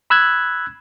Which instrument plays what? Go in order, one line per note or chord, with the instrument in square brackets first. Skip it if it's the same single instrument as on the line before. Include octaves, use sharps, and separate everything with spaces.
[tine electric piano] B5 E6 F#6 G#6